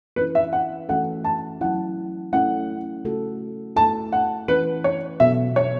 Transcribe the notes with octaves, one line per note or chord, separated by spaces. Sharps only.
E3 C#4 E4 B4
E5
F#5
E3 A3 C#4 F#4 A4 F#5
A5
F#3 C#4 E4 F#5
A3 C#4 E4 A4 F#5
C#3 A3 F#4 A4
A3 E4 A4 A5
F#5
E3 C#4 E4 B4
C#5
B2 F#3 B3 F#4 A4 E5
C#5